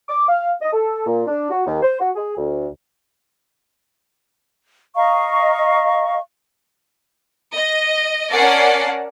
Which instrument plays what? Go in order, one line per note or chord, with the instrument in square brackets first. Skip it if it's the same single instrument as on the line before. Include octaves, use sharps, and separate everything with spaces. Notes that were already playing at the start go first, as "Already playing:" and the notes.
[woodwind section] D6
F5
D#5
A4
A#2
D4
F#4
D#2
C5
F#4
G#4
D2
[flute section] D#5 F5 A#5 C#6
[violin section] D#5
C#4 A#4 D5 F#5 A5 C7